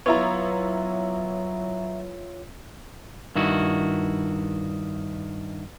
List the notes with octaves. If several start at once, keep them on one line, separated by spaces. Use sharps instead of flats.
F#3 B3 E4 F4 C#5 E5 A#5
G2 D#3 E4 F#4